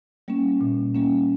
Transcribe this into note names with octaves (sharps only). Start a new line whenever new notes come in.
G3 A#3 C#4
A#2
G3 A#3 C#4